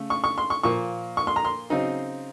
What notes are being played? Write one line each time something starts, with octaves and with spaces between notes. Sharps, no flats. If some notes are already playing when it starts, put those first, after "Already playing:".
Already playing: C#3 A3
C#6
C#6
C6
C#6
A#2 F3 A#3 C#6
C#6
C6
A#5
C6
C#3 F#3 C4 D#4